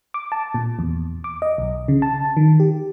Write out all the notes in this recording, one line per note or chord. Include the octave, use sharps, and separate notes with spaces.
D6
A5
A#2
E2
D6
D#5
B1
C#3
A5
D#3
G4